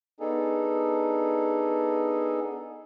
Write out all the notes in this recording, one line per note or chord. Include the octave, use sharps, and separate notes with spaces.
B3 D4 D#4 G#4 A4